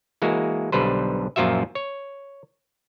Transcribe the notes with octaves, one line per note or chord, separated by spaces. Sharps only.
E3 G#3 A#3 F#4
B1 D3 G3 B4 C5
F#2 A#2 F3 F4 F#4 E5
C#5